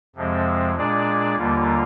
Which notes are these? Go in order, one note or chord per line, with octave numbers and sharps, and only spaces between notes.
F2 C3 F3 G#3 C4
A#2 G#3 D4 G#4 D5
D#2 D3 G3 A#3 F4